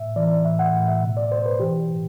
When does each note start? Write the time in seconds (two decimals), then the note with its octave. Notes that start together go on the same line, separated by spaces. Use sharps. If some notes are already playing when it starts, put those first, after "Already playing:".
Already playing: A2 E5
0.16 E3 D5
0.45 A2 E5
0.59 F#5
0.73 A2
0.88 E5
1.03 B2
1.17 D5
1.31 B2 C5
1.46 B4
1.60 E3 G4
1.89 A2